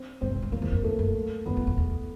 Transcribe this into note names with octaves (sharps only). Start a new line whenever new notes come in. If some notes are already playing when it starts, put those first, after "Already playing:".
Already playing: C4 C5
G2 C4 C5
G#2
G2
F2 A#3 A#4
E2
F2
F#2 A3 A4
F#2
F#2 B3 B4
F2
F2
E2